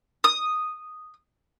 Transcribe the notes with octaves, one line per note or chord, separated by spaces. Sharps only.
D#6